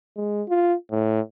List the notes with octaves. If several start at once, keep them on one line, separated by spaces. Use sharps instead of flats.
G#3
F4
A2